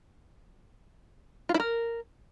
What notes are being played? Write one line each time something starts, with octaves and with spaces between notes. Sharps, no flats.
F4
E4
A#4